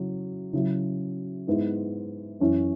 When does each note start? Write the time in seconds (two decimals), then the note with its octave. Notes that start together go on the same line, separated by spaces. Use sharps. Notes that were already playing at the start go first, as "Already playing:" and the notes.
Already playing: C#3 F#3 E4
0.53 C#3 F#3 E4
1.47 G#2 G#3 B3 E4
2.40 F#2 E3 C#4 E4